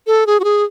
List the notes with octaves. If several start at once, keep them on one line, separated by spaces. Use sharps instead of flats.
A4
G#4
F#4
G#4